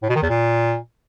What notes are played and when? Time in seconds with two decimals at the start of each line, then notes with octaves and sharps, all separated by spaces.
0.03 A2
0.09 B2
0.16 D#3
0.23 E2
0.29 A#2